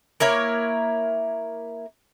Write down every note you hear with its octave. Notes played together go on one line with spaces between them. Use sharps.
A#3 E4 A#4 C#5